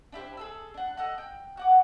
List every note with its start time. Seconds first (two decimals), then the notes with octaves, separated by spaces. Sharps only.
0.12 D4 E4 G4 C5
0.37 G#4 A4 E6
0.74 D4 F#5
0.97 A4 D#5 F#5
1.18 G5
1.57 F#4 F#5 D6